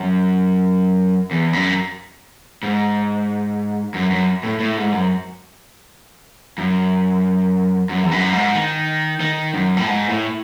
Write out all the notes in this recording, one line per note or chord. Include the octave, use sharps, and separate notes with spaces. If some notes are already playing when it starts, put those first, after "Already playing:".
Already playing: F#2
E2
F#2
G#2
F#2
F#2
A2
A2
G#2
F#2
F#2
F#2
E2
F#2
G#2
D#3
D#3
F#2
A2
G#2
A2